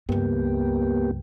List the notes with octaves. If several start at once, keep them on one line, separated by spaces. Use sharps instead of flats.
C#2 G2 A#3 B3 G4